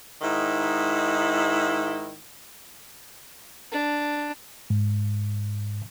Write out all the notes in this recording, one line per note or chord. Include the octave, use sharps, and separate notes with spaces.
G#2 D#3 E4
D4
G#2